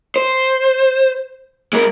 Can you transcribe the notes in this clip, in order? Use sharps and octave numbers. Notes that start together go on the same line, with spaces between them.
C5
G#3 A#4